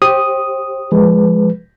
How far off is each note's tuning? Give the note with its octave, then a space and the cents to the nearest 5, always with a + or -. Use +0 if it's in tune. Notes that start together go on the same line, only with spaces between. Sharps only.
G4 +0 C5 +30 D#6 +0
F3 +0 G#3 +5 B4 +5